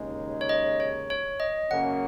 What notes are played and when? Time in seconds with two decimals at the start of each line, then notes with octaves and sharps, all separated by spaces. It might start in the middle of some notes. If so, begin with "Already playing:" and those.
Already playing: D#2 C#3 G#3 D#4
0.41 C#5
0.49 D#5
0.80 C#5
1.10 C#5
1.40 D#5
1.70 F#2 C#3 A#3 C#4 F#5